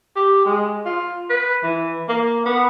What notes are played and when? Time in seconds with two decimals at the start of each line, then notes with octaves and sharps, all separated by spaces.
0.16 G4
0.45 G#3
0.85 F4
1.30 B4
1.63 E3
2.09 A#3
2.46 B3